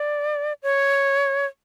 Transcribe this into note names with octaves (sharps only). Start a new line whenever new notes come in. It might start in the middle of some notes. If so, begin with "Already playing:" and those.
Already playing: D5
C#5